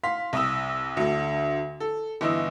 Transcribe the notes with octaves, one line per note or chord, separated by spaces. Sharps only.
F5 C6 B6
C2 D#6 E6
D2 D3
A4
G1 E3 D#5 D#6 E6